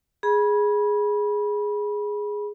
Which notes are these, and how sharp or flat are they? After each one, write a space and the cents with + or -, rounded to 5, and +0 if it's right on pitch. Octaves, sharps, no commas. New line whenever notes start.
G#4 +0 B5 -25